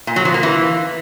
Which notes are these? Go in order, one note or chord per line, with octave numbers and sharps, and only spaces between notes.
A#2
F#3
F3
A#3
E3